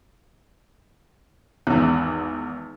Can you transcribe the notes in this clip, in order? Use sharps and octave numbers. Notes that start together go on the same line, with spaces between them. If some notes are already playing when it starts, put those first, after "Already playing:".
G#1 E2